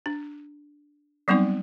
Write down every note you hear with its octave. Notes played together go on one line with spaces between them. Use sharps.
D4
F#3 G3 B3 C4 D#4